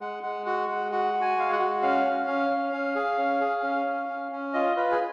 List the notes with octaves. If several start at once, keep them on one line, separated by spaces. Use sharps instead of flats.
G#3 F#5
G#3 F#5
F#4 F#5
G#3 F#5
F#4 F#5
F#4
G#5
G#3 F5
F#5
F#4
C#4 F5
C#4
C#4
C#4
C#4
G#4
C#4
G#4
C#4
C#4
C#4
C#4
F4 D#5
F4 B4
G#4